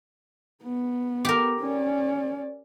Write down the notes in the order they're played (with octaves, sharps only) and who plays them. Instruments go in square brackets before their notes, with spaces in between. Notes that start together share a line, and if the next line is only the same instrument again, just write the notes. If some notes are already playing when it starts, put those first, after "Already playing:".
[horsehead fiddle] B3
[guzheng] G4 A#4
[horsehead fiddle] C#4 D5